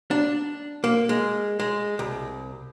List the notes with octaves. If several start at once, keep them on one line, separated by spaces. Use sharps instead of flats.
D4
A#3
G#3
G#3
C2